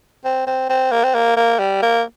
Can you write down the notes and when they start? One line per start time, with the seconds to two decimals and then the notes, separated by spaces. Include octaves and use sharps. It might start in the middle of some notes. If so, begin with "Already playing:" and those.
0.25 C4
0.47 C4
0.69 C4
0.92 A#3
1.04 C4
1.14 A#3
1.36 A#3
1.59 G3
1.82 A#3